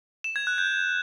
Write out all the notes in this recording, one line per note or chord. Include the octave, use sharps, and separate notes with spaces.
E7
G#6
F#6
G6